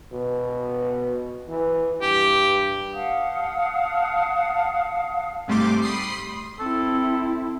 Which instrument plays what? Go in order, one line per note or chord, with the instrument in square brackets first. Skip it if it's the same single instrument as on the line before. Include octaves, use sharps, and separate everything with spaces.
[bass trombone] B2
E3
[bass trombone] G2 [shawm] G4
[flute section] F5 F#5 A5 D#6
[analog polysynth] G#2 C3 G3 A3 C6 D6
B5 C6 D#6 C7
[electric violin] C4 E4 [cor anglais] A4